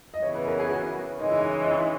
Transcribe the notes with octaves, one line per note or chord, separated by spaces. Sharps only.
D#5
C#3 E3 B3 C#5
B4
A#4
G#4
F#4
C#3 E3 G#3 D#4
E4
D#4
D#4
E4